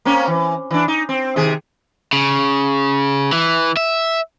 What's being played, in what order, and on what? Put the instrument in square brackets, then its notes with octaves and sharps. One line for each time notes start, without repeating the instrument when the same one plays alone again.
[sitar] A#3 C4 C#4
E3
E3 D4
D#4
C4
C3 D#3 G#4
[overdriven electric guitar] C#3
E3
E5